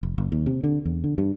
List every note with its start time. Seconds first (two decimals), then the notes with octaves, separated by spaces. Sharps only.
0.03 F1
0.18 F#1
0.32 D#2
0.46 C3
0.64 D3
0.85 E2
1.04 D3
1.18 G2